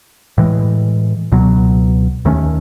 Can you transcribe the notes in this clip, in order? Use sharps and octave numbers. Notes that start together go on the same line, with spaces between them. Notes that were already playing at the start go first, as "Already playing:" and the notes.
A2 E3 G#3
C#2 B2 F#3
D#2 D#3 A3 C#4